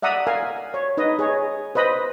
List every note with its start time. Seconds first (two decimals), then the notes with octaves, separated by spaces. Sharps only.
0.02 D5 E5 F#5 A#5 D#6
0.27 A#4 F5 G#5
0.74 C#5
0.97 D#4 B4 D#5
1.19 G#4 C#5
1.75 B4 C5 D#5 B5